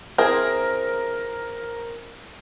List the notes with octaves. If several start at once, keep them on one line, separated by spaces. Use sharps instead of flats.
C4 E4 G#4 A#4